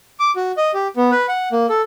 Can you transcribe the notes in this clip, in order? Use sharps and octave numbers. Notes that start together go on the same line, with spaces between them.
D6
F#4
D#5
G4
B3
B4
F#5
A#3
A4